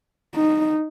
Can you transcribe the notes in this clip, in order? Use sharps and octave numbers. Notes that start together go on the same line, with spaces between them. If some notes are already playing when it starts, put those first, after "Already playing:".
D#4